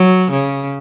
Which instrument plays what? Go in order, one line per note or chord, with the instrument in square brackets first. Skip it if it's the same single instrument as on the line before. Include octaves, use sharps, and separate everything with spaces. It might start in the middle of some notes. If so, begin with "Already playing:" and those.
Already playing: [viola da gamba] F#3
C#3